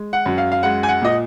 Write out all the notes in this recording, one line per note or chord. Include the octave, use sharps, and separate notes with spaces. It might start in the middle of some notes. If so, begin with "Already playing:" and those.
Already playing: G#3
F#5
F#2
F5
F5
G#3 F#5
G#5
F#5
A#2 D#5